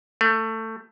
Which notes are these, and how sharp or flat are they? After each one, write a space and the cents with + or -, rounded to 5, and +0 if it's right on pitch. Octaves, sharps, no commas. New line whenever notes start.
A3 +20